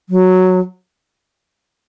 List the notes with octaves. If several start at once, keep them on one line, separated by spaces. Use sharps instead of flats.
F#3